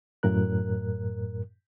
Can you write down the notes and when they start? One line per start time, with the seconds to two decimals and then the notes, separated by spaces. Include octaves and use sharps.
0.23 F#2 A2 A#4 F#6